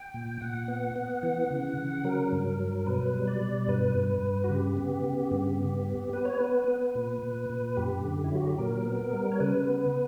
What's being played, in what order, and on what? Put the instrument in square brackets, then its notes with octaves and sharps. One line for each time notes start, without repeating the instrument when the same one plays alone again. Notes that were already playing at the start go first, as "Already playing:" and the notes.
Already playing: [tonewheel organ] G5
A#2
A#2 F#5
B3
B3
E3 F#5
C#3
C#3
F#3 A#4
G2
F#3
B2 B4
G3
D5
B2
G2 B4
G2
G2
F#4
C#3 G4
B3
C#3
G2 G4
B3
B3
B3 B4
C#5
B3 B4
B3
A#2
A#2
A#2
F#2 G4
D3
E4
F#3
F#4
G4
A#2 A#4
B3
G3
C#5
C#3 B4
B3